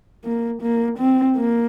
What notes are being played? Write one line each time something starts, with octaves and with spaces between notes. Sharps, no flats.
A#3
A#3
C4
A#3